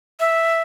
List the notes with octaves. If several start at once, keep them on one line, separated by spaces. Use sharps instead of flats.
E5